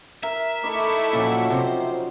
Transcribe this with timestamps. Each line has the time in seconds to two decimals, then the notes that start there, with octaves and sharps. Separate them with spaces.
0.23 A#4 E5
0.63 A3 D#4 E4 B5 C#6 D6
1.13 A#2 C#3 F3 F#3
1.50 C3 C5